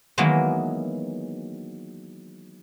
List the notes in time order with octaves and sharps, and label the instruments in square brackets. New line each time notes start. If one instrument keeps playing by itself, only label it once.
[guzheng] D#3 E3 F#3 G#3 A#3 B3